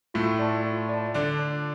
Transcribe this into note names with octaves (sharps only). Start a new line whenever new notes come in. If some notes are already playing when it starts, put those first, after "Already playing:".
A2 A3 F4
D5 A5
F4
D5 A5
D3 D4 F4
D5 A5